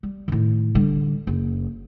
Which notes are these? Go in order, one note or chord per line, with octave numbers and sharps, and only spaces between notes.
G3
A2 D#3
D3 G3
F#1